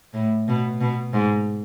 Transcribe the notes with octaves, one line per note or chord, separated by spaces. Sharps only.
A2
B2
B2
G#2